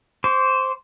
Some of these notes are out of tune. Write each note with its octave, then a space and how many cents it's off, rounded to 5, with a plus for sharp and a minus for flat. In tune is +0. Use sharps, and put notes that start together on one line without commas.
C5 +0 D6 -45